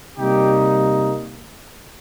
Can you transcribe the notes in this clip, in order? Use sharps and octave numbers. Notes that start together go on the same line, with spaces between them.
C3 G3 A#3 D#4 G4